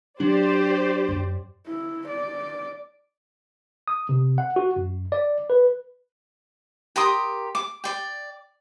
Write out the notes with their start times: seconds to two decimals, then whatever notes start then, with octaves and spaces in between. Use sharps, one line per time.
0.20 F#3 D4 G4 C5 D5
1.08 F#2
1.66 E4
2.08 D5
3.88 D#6
4.09 C3
4.38 F#5
4.56 F#4
4.76 F#2
5.12 D5
5.50 B4
6.96 G4 A#4 C6 D#6
7.55 D6
7.84 D5 G5